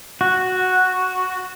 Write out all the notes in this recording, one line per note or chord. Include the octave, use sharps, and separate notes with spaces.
F#4